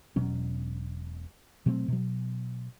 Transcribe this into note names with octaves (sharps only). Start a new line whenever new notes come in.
E1 B2 F#3 C#4
B2 F#3 A3 C4
B2 F#3